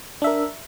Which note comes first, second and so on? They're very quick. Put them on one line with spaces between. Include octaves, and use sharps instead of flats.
D4 E5 A#4